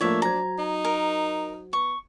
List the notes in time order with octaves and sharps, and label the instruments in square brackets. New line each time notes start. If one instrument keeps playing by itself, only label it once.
[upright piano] F3 A3 A#3 [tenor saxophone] D4 [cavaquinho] C#5 E5
[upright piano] F#3 C5 G#6 [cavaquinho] A#5
[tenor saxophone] D#4
[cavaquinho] A#4
[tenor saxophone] B3 [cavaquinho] C#6